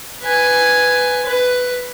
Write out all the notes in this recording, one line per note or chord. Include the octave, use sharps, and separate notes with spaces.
B4 G#5
B4